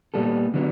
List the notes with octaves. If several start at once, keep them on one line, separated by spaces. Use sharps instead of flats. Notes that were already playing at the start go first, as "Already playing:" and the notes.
A#2 G3 B3 A4
D3 F#3 B3